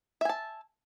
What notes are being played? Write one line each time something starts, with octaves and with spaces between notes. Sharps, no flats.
E5 G#5 A5